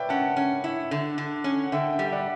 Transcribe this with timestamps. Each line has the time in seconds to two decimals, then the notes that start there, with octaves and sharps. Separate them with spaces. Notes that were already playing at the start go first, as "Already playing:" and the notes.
Already playing: B4 C#5 D5 E5 G5
0.09 C#4 F#5 A5
0.36 C#4
0.64 E4
0.91 D3
1.18 D3
1.44 C#4
1.64 F#5
1.72 D3 E5 G5
1.92 E5 G5
1.99 G3
2.06 E5
2.12 D5 F#5